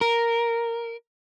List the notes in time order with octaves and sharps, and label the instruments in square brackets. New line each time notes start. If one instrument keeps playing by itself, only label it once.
[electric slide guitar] A#4